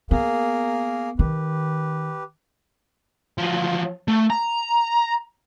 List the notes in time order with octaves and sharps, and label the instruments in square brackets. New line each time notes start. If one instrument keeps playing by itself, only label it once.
[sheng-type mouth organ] A#3 G#4 A#4 [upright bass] B3
[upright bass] D#3 [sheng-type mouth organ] G4 B4
[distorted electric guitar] F3 F#3
A3
A#5